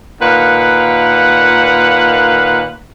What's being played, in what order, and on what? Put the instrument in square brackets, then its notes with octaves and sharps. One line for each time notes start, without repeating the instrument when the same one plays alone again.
[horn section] A#2 D#3 B4 F5 F#5